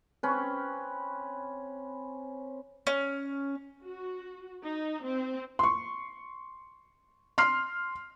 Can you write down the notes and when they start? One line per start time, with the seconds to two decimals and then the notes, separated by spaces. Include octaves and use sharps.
0.23 C4 C#4 B4
2.87 C#4
3.84 F#4
4.65 D#4
5.06 C4
5.59 C6 C#6
7.38 C6 F6 C7